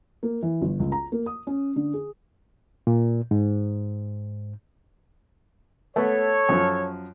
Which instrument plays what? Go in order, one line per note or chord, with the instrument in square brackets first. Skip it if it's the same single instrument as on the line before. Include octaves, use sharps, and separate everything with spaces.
[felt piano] A#3
E3
G1
C#2
A#5
A#3
D#6
C#4
D3
G#4
[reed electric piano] A#2
G#2
[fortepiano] A3 B3 [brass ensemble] A4 C#5
[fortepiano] F#2 F3